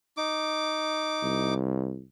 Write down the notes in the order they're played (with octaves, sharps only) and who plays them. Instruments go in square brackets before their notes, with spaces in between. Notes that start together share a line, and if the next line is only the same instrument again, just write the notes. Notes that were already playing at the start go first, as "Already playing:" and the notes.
[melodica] D#4 D6
[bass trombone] C2